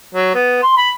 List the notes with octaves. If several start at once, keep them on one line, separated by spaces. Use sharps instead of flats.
F#3
B3
C6
B5